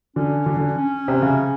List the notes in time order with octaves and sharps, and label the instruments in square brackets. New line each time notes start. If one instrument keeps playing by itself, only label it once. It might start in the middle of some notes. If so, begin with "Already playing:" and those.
[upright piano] D3 [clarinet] C#4
[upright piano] D3
D3
[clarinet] C#4
[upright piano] C3
C#3